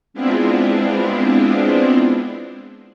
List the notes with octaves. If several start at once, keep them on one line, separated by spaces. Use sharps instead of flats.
G#3 B3 C4 D4 E4 F4